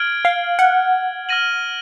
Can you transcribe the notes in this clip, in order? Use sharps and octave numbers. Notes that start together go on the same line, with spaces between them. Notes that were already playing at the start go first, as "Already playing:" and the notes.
Already playing: F6 G#6 D7 F#7
F5
F#5
F6 A#6 D#7 F#7